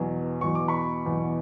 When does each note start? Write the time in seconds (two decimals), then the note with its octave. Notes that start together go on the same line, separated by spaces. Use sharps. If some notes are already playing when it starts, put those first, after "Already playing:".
Already playing: E2 B2 F#3
0.41 E2 B2 F#3 C#6
0.55 D6
0.68 B5 C#6
1.06 E2 B2 F#3